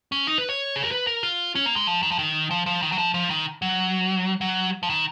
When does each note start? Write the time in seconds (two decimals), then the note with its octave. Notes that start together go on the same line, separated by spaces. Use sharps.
0.12 C#4
0.27 D#4
0.38 B4
0.49 C#5
0.76 G#4
0.84 A#4
0.91 B4
1.07 A#4
1.23 F4
1.55 C#4
1.66 A#3
1.76 G#3
1.87 F3
2.03 D#3
2.11 F3
2.19 D#3
2.51 F3
2.66 F3
2.82 D#3
2.92 F#3
2.98 F3
3.14 F3
3.30 D#3
3.62 F#3
4.41 F#3
4.83 F3
4.90 D#3